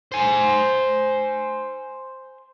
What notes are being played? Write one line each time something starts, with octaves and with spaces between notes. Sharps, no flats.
C5 G#5